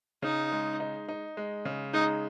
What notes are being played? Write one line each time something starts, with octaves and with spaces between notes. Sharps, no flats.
C#3 D#4
G#3
D#4
D#4
G#3
C#3
G#3 D#4